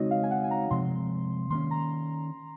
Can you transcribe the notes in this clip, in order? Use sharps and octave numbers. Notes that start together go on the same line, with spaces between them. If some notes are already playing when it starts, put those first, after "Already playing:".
Already playing: C#3 G#3 C4 D#4 F#4 C#5 D#5
F5
G#5
F#5
G#5
A#5
C3 F3 G#3 C4 C6
D#3 A#3 C#4 C6
A#5